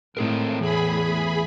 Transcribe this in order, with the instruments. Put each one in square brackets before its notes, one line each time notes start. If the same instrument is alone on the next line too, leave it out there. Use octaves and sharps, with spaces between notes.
[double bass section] A2 [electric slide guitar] C4 G#4 A#4
[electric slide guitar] E2 [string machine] G#4 B5